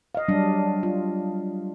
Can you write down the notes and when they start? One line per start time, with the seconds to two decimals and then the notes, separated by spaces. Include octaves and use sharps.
0.15 D#5 F5
0.28 F#3 G3 D4
0.83 F4